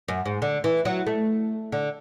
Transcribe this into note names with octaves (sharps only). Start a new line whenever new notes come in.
F#2
G#2
D3
E3
F#3
A3
D3